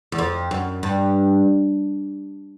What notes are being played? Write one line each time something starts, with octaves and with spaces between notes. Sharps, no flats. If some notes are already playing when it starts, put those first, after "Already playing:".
E2
F2
F#2
G2